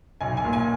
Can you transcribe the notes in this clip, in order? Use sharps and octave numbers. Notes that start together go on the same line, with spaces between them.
B1 G#5
G#5
A#2
G#5